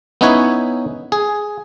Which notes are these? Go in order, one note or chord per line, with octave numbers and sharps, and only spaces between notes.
B3 C#4 D#4 E4 B4 C#5
G#4